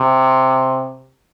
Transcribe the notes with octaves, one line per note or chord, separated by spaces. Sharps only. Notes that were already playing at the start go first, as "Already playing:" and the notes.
Already playing: C3